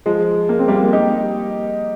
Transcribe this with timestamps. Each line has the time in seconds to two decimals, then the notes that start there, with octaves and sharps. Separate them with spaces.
0.06 F3 G#3
0.49 A#3
0.59 C4
0.68 G3 A#3
0.93 D#4 G4